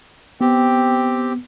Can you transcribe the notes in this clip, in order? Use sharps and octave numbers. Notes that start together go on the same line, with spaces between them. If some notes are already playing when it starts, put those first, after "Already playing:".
B3 C4 G4